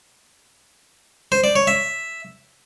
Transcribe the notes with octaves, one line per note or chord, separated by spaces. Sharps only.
C5
D5
C#5
E5